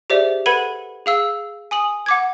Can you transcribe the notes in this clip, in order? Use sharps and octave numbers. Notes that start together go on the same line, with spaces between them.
G4 G#4 C5 D5 E5
A4 B4 F#5 B5 G#6 D#7
G#4 F5 E6
G#5 D#6 F#7
F#5 D6 G#6